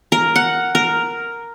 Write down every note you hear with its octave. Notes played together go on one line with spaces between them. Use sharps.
A#4
F#5
A#4